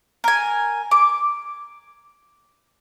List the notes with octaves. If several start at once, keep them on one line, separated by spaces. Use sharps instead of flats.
A#4 G#5
D6